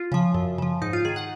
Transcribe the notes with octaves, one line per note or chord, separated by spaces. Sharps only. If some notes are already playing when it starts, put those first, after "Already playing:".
Already playing: F4
C#3 F3
F#2
C#3 F3
G#2 D#4
F4
D#3 G#4
F#5